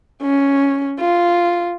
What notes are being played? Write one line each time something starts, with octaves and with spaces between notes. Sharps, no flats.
C#4
F4